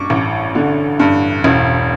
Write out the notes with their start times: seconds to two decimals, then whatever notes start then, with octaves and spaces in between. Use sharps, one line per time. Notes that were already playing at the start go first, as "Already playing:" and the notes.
Already playing: G2 C#6 D6
0.10 A1
0.55 D3
1.00 G2
1.44 E1